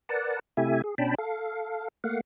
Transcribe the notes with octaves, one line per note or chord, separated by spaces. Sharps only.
A#4 B4 D5 F#5 A5
C3 A3 E4 G4 E5 G#5
G#4
B2 C#4 D4 G5 A5 B5
A4 F5
A3 A#3 F5 F#5